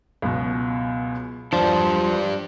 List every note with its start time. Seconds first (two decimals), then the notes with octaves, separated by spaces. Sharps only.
0.22 C#2 F#2 B2
1.53 E1 F3 G3 D4